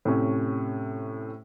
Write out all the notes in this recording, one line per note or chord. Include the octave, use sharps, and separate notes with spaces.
A2 C3 C#4